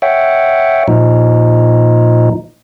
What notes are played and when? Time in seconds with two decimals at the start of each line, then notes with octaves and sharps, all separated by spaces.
0.02 C#5 E5 F#5 G5
0.88 A#2 F3 D#4